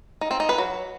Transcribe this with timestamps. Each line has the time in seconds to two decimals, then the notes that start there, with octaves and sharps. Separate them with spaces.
0.21 D#4
0.31 C4
0.40 D#4
0.49 B4
0.58 F#3